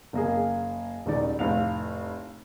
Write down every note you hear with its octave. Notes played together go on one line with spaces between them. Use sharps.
F#1 A#3 G#4
D#1 C#2 D#3 D#4 D5
F1 A2 F5 F7